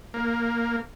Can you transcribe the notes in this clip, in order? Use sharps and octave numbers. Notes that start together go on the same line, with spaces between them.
A#3